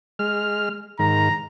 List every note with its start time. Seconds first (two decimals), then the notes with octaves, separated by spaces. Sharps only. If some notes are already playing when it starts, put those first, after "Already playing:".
0.19 G#3 F6
0.99 G#2 D#3 A#5